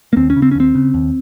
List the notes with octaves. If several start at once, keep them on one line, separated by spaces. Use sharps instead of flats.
A#3
D#2 C4
C#4
C#3
C4
C#4
D#2 C4
C#3
D#2